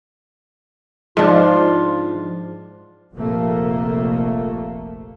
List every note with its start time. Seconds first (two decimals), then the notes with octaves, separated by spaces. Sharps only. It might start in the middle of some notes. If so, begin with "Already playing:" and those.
1.17 G#2 F3 D4 F4
3.15 F1 A#1 F2 C3 A3 A#3